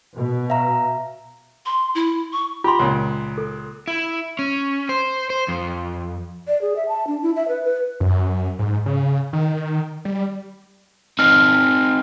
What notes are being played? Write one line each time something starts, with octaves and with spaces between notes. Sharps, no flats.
B2
E5 F5 A#5
C6
E4
C#6
F4 G4 A#5 C6
C#2 A#2
A4
E4
C#4
C5
C5
F2
D5
G#4
E5
A5
D4
E4
E5
B4
B4
F#2
G#2
C#3
D#3
G3
C4 D#4 F6